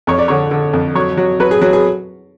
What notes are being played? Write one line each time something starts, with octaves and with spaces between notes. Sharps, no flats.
F2 C#5
D5
D3 C#5
D3
F2
F#3 C#5
F#3
F#3 B4
G#4
F#3
G#4